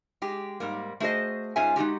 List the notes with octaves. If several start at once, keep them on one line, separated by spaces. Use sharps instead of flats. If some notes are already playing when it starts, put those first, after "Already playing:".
G#3 G4
G#2 G3 A#3
A3 F#4 G#4 C5 D#5
G#2 C#4 F4 G#4 E5 G#5
G#3 D#4 F#4 G4